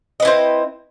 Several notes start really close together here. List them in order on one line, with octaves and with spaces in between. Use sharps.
D#5 B4 E4 C4